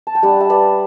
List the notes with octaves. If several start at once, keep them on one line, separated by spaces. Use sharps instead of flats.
A5
G5
G3 D4 D5 F#5
E5
B4 D5